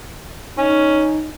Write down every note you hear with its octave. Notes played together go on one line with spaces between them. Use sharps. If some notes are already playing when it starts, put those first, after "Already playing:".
C#4 D#4